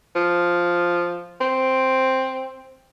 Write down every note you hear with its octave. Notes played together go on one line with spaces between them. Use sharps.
F3
C4